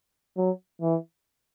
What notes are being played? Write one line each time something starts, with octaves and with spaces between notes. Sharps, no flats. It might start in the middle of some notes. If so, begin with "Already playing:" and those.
F#3
E3